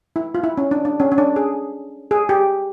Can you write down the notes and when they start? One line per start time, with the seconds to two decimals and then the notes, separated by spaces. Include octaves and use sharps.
0.16 E4
0.35 F4
0.44 E4
0.58 C#4
0.71 D4
0.85 D4
1.00 C#4
1.12 C#4
1.18 D4
1.36 G#4
2.11 G#4
2.29 G4